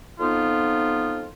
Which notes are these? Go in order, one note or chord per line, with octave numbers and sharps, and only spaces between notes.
F2 B3 D#4 F4